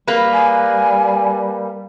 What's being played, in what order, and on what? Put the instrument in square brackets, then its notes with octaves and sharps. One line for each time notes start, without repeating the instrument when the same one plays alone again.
[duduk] G3 [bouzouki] A#3 B4
[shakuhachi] G#5